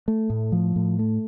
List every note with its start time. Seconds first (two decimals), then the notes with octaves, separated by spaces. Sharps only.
0.08 A3
0.30 A2
0.52 F3
0.76 A2
0.99 A3